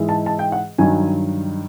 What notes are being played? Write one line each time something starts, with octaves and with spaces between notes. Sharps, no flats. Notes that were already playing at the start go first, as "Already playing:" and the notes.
Already playing: G#2 E3 G#3
A5
A5
G5
F#5
G2 D#3 F#3 G#5